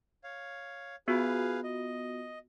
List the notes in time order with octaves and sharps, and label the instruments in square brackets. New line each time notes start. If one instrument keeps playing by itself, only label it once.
[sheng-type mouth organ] C#5 F5
[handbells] B3 F4 F#4 [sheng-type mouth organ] G#4 B4 F5
[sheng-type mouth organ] D#5